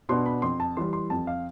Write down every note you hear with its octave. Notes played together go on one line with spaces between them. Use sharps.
B2 B3 D4 C6
B5
F2 C6
A5
E3 G3 C6
C6
F2 A5
F5